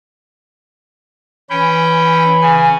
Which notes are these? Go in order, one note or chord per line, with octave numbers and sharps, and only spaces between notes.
E3 C#4 G5 B5
C#3 G#5